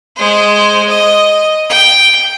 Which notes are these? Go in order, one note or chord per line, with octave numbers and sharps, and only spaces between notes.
G#3 C5
D#5
G5